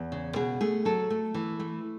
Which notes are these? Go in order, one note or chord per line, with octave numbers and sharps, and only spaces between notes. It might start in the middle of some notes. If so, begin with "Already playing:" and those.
Already playing: E2
C#3
B2 G#4
A3 G#4
F#3 A4
A3
E3
A3